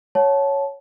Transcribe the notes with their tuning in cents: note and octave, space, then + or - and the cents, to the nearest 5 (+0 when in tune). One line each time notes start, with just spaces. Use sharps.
C#5 +0 F#5 +0 A5 -15